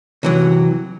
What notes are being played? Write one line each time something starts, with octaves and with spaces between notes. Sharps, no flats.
C3 E3 F#3